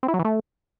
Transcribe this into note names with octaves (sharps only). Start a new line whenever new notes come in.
C4
E4
F#3
E3
A3